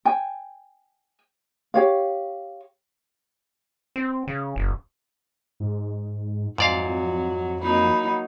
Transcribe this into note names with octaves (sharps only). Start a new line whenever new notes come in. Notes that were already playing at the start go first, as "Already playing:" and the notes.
G5 G#5
G4 C#5 F5
C4
C#3
F#1
G#2
F2 G#2 F#3 D5 F5
F#3 A#3 D#4 B5